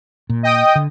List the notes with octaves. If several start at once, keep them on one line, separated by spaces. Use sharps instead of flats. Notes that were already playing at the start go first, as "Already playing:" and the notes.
A#2
D#5 G5 D#6
D3